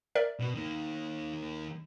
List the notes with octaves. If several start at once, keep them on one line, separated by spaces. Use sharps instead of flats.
A#4 D5 E5
B2 B3
D#3 A#3